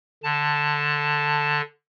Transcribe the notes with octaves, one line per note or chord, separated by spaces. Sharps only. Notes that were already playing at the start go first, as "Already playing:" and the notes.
D3 A5